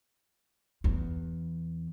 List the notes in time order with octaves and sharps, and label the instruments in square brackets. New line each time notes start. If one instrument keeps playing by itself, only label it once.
[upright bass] E2